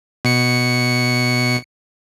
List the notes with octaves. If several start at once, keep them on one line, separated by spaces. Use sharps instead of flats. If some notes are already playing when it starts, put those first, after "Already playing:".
B2 C#7